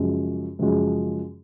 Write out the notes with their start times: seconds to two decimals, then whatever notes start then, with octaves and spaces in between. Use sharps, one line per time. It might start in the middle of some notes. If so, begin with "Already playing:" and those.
Already playing: F#2 C#3 F3 G#3
0.59 F#2 C#3 F3 G#3